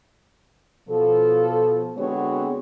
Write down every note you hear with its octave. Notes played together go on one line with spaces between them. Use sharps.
B2 F3 A4
D3 G#3 B3 C4 F#4 C#5